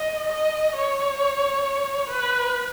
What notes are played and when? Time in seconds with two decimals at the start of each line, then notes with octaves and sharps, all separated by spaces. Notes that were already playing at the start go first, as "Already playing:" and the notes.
Already playing: D#5
0.30 D#5
0.75 C#5
2.10 B4